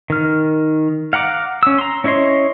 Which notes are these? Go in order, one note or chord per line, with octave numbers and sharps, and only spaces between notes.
D#3 F6
F5 F#5 A#5 D6
C#4 E6
A#5 C6
C#4 E4 C#5 D#5 C6